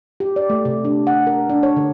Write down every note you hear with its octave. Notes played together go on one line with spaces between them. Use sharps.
G4
D5
A3
C3
D4
F#5
A#4
D4
C#5
D3